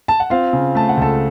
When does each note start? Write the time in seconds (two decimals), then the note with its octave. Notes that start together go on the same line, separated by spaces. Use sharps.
0.08 A5
0.20 F#5
0.30 C4 F4 F5
0.53 C#3
0.75 A3 A5
0.89 F#5
0.97 C#2 A4 A5